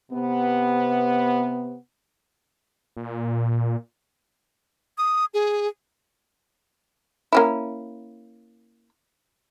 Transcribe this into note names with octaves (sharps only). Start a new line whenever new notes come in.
C3 B3
A#2
D#6
G#4
A#3 C#4 E4